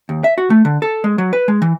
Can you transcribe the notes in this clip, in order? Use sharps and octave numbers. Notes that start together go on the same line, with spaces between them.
D#2
E5
F#4
A3
D3
A4
G#3
F#3
B4
G#3
E3